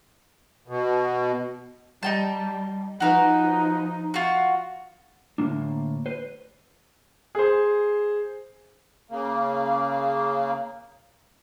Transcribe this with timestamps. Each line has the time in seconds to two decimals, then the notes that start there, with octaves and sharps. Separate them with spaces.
0.68 B2
2.03 G3 D#4 G5 A5
3.00 F3 D#4 F#4 A#4 B4
4.14 F4 F#4
5.38 D2 A2 C#3 A#3 D4
6.06 B4 C5
7.35 G#4 C5
9.11 C#3 A#3